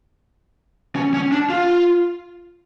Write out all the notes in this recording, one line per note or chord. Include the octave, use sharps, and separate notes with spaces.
C#4
C#4
D4
F4